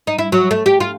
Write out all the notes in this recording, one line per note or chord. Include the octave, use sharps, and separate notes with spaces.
D#4
E4
F#3
A3
G4
F4